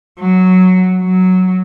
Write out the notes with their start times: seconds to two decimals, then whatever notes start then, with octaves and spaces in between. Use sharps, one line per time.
0.19 F#3
1.03 F#3